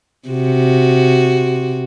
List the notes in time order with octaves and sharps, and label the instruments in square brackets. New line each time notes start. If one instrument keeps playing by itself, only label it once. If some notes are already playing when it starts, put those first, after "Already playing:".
[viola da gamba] C3 F#4